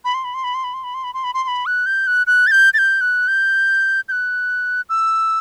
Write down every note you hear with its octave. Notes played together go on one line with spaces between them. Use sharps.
B5
C6
B5
C6
B5
C6
B5
C6
B5
C6
B5
C6
B5
C6
C6
B5
F#6
G6
F#6
F#6
A6
G6
A6
G6
F#6
G6
G6
F#6
E6